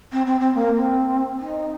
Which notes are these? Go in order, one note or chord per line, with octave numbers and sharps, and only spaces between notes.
C4
C4
C4
A#3
C4
D#4